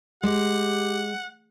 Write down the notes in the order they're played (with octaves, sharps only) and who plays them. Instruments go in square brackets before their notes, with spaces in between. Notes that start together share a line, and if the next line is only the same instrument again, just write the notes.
[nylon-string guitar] G#3 [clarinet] G4 [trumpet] F#5